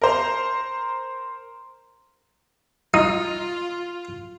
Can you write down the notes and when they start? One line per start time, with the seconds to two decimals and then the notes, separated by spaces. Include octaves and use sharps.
0.02 A#4 C5 A#5
2.94 D#4 F4